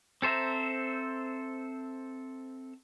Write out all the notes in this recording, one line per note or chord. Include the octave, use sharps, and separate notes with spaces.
C4 A4 C5 E5 A#5